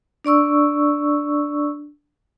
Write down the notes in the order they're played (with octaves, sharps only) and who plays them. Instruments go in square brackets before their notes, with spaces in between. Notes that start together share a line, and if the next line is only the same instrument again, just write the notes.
[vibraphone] D4 D5 C#6 E6